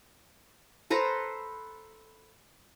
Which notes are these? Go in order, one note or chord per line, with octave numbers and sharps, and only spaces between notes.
A4 B4 C5 A#5